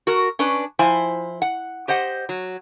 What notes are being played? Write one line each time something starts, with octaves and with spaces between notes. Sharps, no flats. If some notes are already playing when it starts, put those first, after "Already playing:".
F#4 A#4
C#4 D4 B4
F3 E4 C5 G#5
F#5
G4 C5 D#5 F#5
F#3